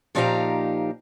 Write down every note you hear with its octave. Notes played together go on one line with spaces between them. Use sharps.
A#2 F3 D#4 G4 F5 A#5